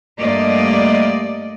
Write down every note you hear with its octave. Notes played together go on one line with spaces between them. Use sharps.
G2 A3 A#3 D5 D#5